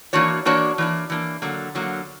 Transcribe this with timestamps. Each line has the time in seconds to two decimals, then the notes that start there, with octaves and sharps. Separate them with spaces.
0.13 E3 A#3 D4 F#4 C#5
0.45 E3 A#3 D4 F#4 C#5
0.78 E3 A#3 D4
1.10 E3 A#3 D4
1.42 D3 F#3 A#3
1.75 D3 F#3 A#3